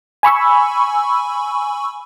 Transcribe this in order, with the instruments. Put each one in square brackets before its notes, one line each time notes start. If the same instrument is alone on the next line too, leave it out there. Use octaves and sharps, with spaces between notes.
[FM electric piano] G#5 B5 C#6 E6